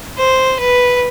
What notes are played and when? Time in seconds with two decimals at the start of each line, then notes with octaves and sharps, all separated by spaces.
0.18 C5
0.60 B4